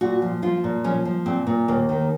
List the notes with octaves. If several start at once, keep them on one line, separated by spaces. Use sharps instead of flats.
A#2 F#4
F3
F3 F4
A#2
F3 C#4
F3
A#2 C4
A#2
D#2 A#3
D#3